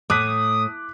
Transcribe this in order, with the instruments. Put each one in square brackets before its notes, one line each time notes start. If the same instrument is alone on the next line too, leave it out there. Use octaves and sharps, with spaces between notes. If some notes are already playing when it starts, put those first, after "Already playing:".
[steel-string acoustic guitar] A2 [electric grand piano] D6 F#6 B6 [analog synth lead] D#6